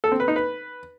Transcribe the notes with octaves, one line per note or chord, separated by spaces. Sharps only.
A4
C4
B4
D#4
B4